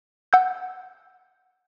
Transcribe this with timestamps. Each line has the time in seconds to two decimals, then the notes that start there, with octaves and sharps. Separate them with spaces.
0.33 F#5 E6 G6